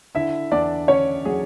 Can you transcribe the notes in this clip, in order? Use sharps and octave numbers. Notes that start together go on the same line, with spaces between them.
D3 E4 E5
E2 D4 D5
D3 C#4 C#5
F#3 G#4